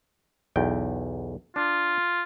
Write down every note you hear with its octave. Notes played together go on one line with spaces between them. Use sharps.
B1 E2 G5
D4 F4